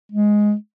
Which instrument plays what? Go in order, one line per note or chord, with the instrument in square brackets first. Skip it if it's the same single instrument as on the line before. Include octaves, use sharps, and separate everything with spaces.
[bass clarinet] G#3